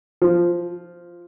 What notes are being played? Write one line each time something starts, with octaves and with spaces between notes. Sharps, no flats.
F3